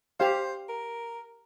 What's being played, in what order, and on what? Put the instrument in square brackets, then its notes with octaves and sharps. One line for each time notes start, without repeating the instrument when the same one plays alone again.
[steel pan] G4 F5 [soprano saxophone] C5
[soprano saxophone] A#4